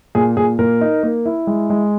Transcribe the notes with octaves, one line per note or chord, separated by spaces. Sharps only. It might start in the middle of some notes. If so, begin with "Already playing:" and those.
A#2 G#4
A#2 G#4
A#2 A#4
D#4
A#3
E4
G#3
G#3